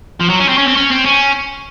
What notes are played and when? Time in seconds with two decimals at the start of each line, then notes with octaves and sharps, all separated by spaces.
0.20 F3
0.30 F#3
0.40 C#4
0.49 C4
0.58 C#4
0.68 C4
0.77 C#4
0.91 C4
1.06 C#4